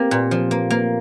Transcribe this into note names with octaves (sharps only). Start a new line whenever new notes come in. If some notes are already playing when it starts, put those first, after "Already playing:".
Already playing: A#3 C4 G4
A#2
F3
A#3
A#3